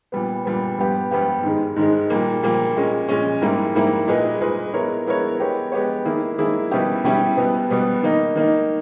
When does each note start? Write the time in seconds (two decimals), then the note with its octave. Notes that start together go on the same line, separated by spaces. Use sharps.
0.12 A#2 G3 B3
0.45 A#2 G3 B3
0.78 G2 G3 B3 G4
1.11 G2 G3 B3 G4
1.44 G#2 D#3 G#3
1.76 G#2 D#3 G#3
2.10 A#2 G3 A#3
2.43 A#2 G3 A#3
2.76 A#2 G#3 C#4
3.09 A#2 G#3 C#4
3.42 G#2 G3 A#3 E4
3.75 G#2 G3 A#3 E4
4.07 A#2 G#3 D#4 G#4 B4
4.41 A#2 G#3 D#4 G#4 B4
4.74 G#3 B3 E4 A#4 C#5
5.06 G#3 B3 E4 A#4 C#5
5.39 G#3 B3 G4 C#5
5.72 G#3 B3 G4 C#5
6.05 D#3 A#3 E4 G#4
6.38 D#3 A#3 E4 G#4
6.72 B2 G3 C#4 E4 G4
7.04 B2 G3 C#4 E4 G4
7.37 B2 G3 B3
7.70 B2 G3 B3
8.03 D#3 A#3 D#4
8.36 D#3 A#3 D#4